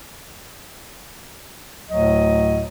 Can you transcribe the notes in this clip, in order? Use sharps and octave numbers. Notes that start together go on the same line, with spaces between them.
D2 A2 F#3 D#5